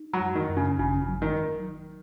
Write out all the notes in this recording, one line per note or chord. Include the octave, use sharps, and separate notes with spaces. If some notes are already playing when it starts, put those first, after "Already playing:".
Already playing: D#4
F#3
F#2
D#3
F#2
C#3
G#1 C#3
F#3
D#3